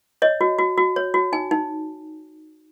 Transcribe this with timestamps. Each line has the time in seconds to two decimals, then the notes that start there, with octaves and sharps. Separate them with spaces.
0.22 C#5 D#5
0.41 F#4
0.59 F#4
0.78 F#4
0.96 C#5
1.14 F#4
1.33 D#4 G#5
1.51 D#4